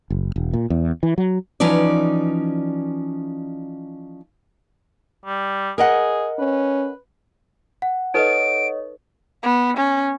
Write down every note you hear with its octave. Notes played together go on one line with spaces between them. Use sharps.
F#1
E1
A#2
E2
E3
F#3
E3 F3 C#4 D#4 D5
G3
G#4 A#4 D#5 F#5
C#4 B4
F#5
D#4 A4 B4 C#5 D#5 D7
B3
C#4